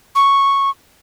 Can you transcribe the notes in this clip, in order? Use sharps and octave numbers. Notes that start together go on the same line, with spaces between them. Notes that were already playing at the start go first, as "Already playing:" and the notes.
C#6